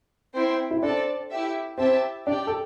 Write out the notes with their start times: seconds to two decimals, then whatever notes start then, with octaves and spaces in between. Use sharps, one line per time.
0.34 C4 E4 C5 G5
0.71 E4
0.81 C4 D4 A4 D5 A5
1.31 E4 G4 E5
1.78 C4 E4 G4 E5 A5
2.26 D4 G4 D5 G5
2.47 A4